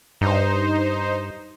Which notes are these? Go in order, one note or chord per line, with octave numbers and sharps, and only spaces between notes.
G2 D#4 C5